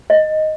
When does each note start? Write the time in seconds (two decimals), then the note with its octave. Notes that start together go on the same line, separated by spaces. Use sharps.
0.10 D#5